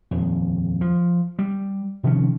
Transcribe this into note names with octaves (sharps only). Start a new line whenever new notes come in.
D#1 F2
F3
G3
C3 D#3 F3 C#4